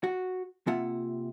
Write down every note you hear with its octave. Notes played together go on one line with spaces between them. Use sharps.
F#4
C3 A#3 F4 E5 F#5